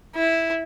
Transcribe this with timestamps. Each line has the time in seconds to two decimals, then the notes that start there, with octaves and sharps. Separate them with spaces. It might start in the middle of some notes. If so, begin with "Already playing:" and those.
0.16 E4